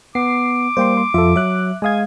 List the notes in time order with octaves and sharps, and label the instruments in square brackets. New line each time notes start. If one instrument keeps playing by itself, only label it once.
[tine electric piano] B3 [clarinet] D6 [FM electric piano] C7
[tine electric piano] G3 A#3 [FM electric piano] C5 G5 C6
[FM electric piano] C6
[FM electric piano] F2 F3 E5 [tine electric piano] F4 A4
[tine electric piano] F#3 [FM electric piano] E5 F#6
[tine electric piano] G#3 F5 [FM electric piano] G#5 D#6 G#6